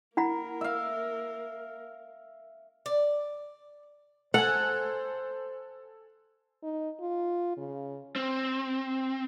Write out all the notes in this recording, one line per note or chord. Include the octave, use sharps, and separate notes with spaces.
A#3 E4 A#4 F#5 B5
E5 F5
D5
A4 C5 F#5 G#5
D#4
F4
C#3
C4